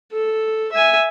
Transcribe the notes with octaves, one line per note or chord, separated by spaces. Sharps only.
A4
E5 G#5